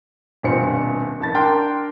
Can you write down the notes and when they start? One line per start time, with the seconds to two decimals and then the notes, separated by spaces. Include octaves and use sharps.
0.43 D#1 G2 B2 C4 F4 C#7
1.20 A1 A5 A6
1.34 D4 A#4 G5 C6